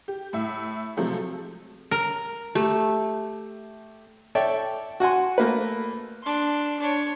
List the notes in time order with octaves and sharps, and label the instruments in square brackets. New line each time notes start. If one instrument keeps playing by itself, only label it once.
[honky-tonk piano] G4
A2 E5
C3 F3 F#3 G#3 A3 A4
[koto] A#4
[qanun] A3 [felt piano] G4
[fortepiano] A4 C#5 D5 E5 G5
F#4 F#5 G#5 C6
A3 A#3 B4
[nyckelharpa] D4 C6
D4 C#5